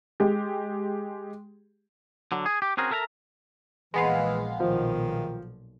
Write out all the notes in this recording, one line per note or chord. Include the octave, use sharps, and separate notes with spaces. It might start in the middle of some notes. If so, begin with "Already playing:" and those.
G#3 G4
D3 F#3
G#4
G4
C4 C#4 F#4 G#4 A#4 C5
A4 A#4 E5 F#5 A#5
A#1 A#2 E3 G#3 B3 F5
B1 A#2 D#3 F3